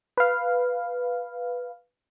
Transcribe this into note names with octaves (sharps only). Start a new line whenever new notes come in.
B4 F5